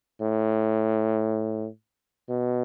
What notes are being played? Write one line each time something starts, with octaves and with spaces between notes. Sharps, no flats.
A2
B2